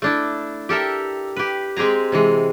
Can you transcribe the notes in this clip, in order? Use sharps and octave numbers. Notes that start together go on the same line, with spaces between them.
A3 D4 E4
G4 A4 A#4 E5
G4 B4
G#3 C4 G4 G#4 A#5
C3 E3 G#3